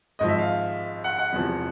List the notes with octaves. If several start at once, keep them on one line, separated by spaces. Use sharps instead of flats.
G#1 G#2 F3 D#5
E5
F5
F#5
F#5
E1 E2 C3 F3